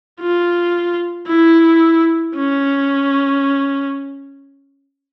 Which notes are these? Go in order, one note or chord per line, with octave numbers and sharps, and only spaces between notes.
F4
E4
C#4